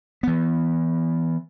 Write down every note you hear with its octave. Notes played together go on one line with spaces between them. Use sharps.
E3 B3